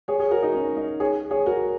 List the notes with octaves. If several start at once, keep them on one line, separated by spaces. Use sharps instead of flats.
G#4 C#5
G#4 C#5
F#4 A#4
D#4
C#4
D#4
G#4 C#5
G#4 C#5
F#4 A#4